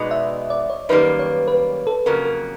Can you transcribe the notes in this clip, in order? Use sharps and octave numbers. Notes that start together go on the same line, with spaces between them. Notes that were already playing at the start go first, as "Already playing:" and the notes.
Already playing: B2 G#3 B3 D#4 F#4 D5 D#5
E5
D5
C#5
F#2 D#3 G3 A#3 B4
C#5
B4
A4
F2 C#3 F#3 A#3 A#4
A#4